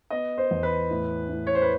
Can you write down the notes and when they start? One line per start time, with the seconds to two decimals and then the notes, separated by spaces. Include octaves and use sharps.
0.10 B3 D#5
0.38 C5
0.51 E2
0.63 B4
0.91 A2
1.29 A2
1.47 C#5
1.55 C5
1.62 B4